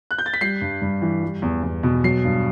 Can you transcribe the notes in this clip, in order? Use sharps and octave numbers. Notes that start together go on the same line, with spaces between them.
F#6
G6
A6
B6
G3 C7
G2
G2
E3
G3
E2
E2
B2
F#3 C7
G2